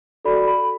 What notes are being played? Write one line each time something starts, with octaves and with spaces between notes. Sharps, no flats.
F#4 A4 D5 B5
B5